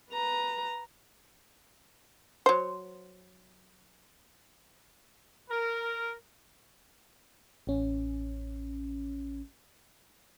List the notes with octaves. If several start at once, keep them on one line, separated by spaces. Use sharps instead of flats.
B4 A#5
F#3 C5
A#4
A1 C#4